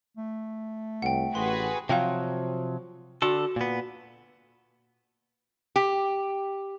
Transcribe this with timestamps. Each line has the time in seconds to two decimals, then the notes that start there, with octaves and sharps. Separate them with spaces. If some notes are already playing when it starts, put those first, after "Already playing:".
0.17 A3
1.02 C2 F#5 G5
1.35 A1 F#4 G#4 B4 C6
1.89 C3 F3 F#3 F5 G5
3.22 D3 F#4 A4
3.56 A#2 B3
5.76 G4